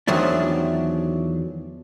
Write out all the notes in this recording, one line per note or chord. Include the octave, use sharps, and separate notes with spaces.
E2 D#3 F3 F#3 A3 D4